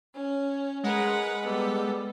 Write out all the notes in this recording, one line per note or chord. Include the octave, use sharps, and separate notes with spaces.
C#4
G#3 A#4 B4 F#5
G3 B3 A4